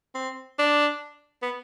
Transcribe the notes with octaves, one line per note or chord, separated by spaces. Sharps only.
C4
D4
B3